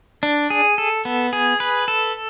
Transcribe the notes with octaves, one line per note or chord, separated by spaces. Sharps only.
D4
G#4
A4
B3
G#4
B4
A4